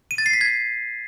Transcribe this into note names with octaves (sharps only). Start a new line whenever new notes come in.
D#7
A6
C7
B6
G#6